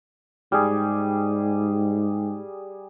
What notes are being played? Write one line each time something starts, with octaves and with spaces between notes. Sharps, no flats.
G#2 G3 G#4